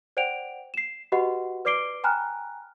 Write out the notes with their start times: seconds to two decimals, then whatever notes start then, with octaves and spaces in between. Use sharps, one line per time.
0.17 C5 D5 F#5 G5 D7 F7
0.74 C7 E7
1.12 F#4 G4 B4 D#5 F#5 B5
1.65 B4 D5 D6 C7 D7 G7
2.04 G5 G#5 A#5 B5 F6 F#6